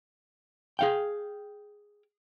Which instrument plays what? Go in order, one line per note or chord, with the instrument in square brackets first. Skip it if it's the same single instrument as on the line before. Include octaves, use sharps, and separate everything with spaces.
[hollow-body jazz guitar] G#4 F5 G5